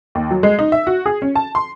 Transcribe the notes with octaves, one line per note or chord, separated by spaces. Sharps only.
D#2
F#3
G#3
D#4
E5
F#4
G#4
C#4
A5
C6